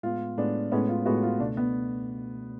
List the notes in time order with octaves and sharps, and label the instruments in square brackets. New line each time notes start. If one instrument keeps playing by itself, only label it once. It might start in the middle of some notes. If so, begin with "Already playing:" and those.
[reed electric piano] A2 G#3 B3 [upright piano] F4
[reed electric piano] A2 G#3 B3 [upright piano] D4
[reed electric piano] A2 G#3 B3 [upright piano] C#4
[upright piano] F4
[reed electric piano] A2 G#3 B3 [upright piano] F#4
[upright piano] F4
[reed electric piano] C#2 B2 A3 [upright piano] D4
[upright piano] B3